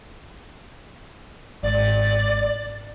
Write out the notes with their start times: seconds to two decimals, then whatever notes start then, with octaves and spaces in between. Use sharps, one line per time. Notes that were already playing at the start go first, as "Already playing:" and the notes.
1.63 G#1 D5